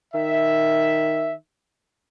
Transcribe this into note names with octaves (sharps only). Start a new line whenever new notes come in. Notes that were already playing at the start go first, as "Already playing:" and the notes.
D#3 E5